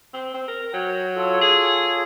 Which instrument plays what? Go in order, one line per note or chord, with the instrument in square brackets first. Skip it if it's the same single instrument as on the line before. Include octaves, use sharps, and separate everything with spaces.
[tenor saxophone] C4
C4
A#4
[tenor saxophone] F#3 [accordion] G5
[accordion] F4 A4 C#5
[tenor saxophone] G#4